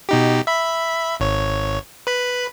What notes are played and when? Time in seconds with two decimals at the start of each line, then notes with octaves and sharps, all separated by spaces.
0.09 B2 D#4 G4
0.47 E5 B5
1.20 G#1 C#5
2.07 B4 B5